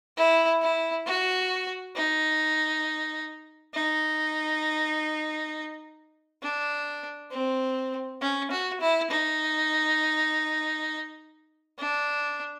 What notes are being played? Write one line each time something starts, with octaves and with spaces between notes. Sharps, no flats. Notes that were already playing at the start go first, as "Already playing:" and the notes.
E4
E4
F#4
D#4
D#4
D4
C4
C#4
F#4
E4
D#4
D4